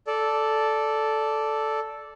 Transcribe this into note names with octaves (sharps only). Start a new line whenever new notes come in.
A4 D5